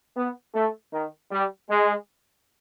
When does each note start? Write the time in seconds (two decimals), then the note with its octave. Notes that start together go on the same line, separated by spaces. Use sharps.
0.17 B3
0.54 A3
0.93 D#3
1.31 G3
1.70 G#3